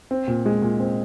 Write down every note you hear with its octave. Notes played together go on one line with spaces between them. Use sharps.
C4
A#2
G#3
A#2
C4